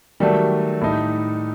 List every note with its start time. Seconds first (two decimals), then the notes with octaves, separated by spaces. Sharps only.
0.20 D#3 F#3 G3 A3
0.81 A2 A3 D#4